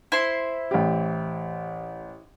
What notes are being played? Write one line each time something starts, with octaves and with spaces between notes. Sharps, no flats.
E4 C5 C6
A1 G4